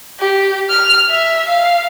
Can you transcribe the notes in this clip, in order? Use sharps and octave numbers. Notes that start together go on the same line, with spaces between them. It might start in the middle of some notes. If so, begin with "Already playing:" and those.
G4
F6
E5
F5